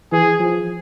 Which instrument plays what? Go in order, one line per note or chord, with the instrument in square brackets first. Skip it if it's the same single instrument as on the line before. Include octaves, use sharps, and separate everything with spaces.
[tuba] E3 [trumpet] G#4
[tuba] F3